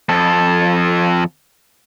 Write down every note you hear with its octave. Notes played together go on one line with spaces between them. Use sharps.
F2 A4